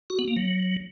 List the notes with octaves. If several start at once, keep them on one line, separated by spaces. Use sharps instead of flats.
F#4
B3
A#3
F#3